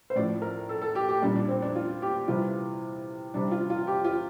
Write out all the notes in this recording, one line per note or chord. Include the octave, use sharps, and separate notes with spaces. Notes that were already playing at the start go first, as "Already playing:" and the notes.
C5
A2 F3 D5
A#4
A4
A4
G4
G4
A#2 G3 D4
D4
C4
D4
F4
G4
C3 E3 G3 F4
C3 G3 D4
F4
F4
G4
F4